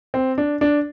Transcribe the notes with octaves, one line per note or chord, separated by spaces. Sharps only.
C4
D4
D4